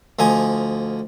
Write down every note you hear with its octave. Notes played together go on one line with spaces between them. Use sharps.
D2 F3 D#4 G#5